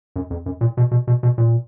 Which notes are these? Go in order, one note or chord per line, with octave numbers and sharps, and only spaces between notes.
F#2
F2
F#2
A#2
B2
B2
B2
B2
A#2